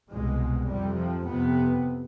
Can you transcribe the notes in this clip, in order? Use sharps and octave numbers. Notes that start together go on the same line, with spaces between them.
C2 B2 G#3
F2 C3 G3
F3
F2 C3 B3